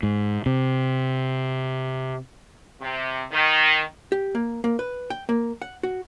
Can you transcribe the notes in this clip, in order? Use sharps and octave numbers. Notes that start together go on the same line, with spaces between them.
G#2
C3
C3
D#3
G4
A#3
A#3
B4
G5
A#3
F#5
F#4